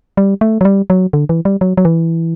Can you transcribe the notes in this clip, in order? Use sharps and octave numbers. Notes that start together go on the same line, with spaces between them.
G3
A3
F#3
G3
F#3
D3
E3
G3
F#3
F#3
E3